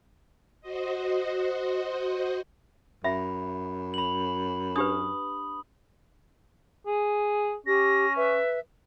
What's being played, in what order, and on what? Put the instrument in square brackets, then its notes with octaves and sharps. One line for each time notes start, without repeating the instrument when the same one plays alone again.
[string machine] F#4 C5 D#5
[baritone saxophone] F#2 [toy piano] E5 [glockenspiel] B5
[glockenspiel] B5 F#7
[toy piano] D4 G4 B4 [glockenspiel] D#6
[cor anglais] G#4
[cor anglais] C#4 [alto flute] G4 [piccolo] A#6
[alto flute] B4 [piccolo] E5